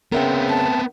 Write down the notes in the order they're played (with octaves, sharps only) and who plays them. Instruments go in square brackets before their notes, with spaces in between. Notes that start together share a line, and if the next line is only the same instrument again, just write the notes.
[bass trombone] C#3 [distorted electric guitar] B3 C4 [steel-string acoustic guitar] A#4 E5 G5
[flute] A5